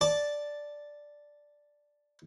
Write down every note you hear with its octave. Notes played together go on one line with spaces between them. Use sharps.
D5 A5